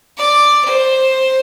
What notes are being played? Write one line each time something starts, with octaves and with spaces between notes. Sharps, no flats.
D5
C5